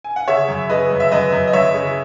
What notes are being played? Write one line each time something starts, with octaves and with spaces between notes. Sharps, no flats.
G#5
F#5
C#3 C#5 E5
F#2
C#3 B4 D#5
F#2
E5
F#2 B4 D#5
F#2
D#5
F#2 C#5 E5
C#3